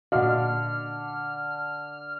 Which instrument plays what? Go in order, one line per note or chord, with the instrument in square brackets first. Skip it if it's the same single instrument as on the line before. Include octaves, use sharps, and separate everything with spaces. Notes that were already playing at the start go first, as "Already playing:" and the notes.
[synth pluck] A#2 F#4 [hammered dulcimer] D3 [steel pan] D#5 F5 [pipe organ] F6